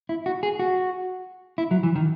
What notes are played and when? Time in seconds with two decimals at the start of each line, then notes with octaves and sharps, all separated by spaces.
0.09 E4
0.26 F#4
0.43 G#4
0.59 F#4
1.58 E4
1.71 F#3
1.83 E3
1.96 D#3